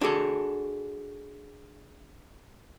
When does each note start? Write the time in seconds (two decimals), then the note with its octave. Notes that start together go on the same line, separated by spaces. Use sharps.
0.01 D4 F#4 G#4 A4